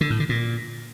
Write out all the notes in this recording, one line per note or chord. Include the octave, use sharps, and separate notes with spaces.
D3
A2
D3
A#2